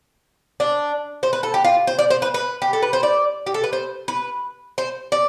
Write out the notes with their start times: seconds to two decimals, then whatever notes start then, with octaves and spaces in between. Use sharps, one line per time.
0.60 D4
1.23 C5
1.33 B4
1.43 A4
1.54 G4
1.64 F4
1.87 C5
1.99 D5
2.10 C5
2.22 B4
2.34 B4
2.62 G4
2.73 A4
2.82 B4
2.93 C5
3.03 D5
3.46 G4
3.54 A4
3.64 B4
3.73 C5
4.08 B4
4.78 C5
5.12 D5